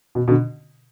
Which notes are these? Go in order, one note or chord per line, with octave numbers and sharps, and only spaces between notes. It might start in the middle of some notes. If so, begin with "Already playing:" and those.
B2
B2 D3